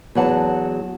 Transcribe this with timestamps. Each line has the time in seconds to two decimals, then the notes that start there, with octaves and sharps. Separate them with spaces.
0.15 E2 F#3 F#5 A5